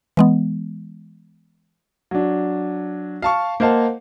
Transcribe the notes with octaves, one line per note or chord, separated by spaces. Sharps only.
E3 G#3 B3
F#3 D4
F5 A5 C#6
A#3 C5 D#5 F5 F#5 A5